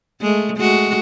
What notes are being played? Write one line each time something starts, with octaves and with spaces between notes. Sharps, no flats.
G#3 A3
G#3 A3 F#4